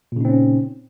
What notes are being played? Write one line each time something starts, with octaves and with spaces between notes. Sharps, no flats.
A#2 C#3 C4 C#4 D#4